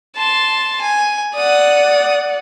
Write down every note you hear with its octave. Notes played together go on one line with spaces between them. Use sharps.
A5 C6
G#5
D5 F#5 D#6